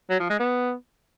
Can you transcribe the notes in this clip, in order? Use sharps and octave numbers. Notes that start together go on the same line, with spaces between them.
F#3
F3
G#3
B3